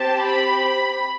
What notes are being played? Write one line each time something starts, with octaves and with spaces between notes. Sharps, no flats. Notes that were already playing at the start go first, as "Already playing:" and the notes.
Already playing: C4 G4 A5
B5